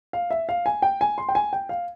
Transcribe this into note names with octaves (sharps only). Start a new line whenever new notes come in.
F5
E5
F5
G#5
G5
G#5
C6
G5
G#5
G5
F5